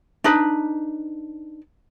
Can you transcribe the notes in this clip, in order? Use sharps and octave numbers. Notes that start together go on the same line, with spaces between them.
D4 D#4 B4